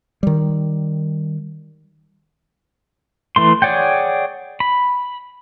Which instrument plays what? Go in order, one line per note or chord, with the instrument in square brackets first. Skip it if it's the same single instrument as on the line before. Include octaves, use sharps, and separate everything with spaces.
[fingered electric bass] D#3 G3
[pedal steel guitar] E3 A3 C6
G#4 C#5 D5 F#5 G5
B5